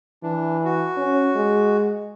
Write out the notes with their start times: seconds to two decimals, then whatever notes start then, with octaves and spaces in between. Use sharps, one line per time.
0.23 E3 D4
0.65 F#4
0.97 C#4
1.36 G#3